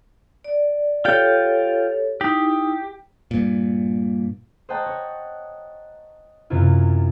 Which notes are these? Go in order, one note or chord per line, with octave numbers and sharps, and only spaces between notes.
D5
F4 G4 A4 C#5 G5
D#4 E4 G4
G2 A#2
C5 D#5 F#5 G5 A5 A#5
C#5
F#2 C3 E4 F4